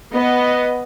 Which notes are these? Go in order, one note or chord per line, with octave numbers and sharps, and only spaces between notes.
B3 D#5